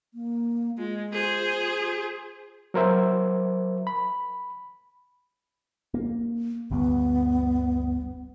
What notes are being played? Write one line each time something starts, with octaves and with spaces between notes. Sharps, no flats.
A#3
G#3 F4
G#4 C5
F#3 A#4 C5 E5
B5
A#3
G1 D2 G2 B3